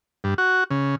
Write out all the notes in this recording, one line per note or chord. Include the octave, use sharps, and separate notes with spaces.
G2
F#4
C#3